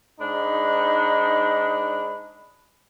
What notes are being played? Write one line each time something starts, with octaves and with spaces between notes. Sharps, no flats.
G#2 D4 D#4 B5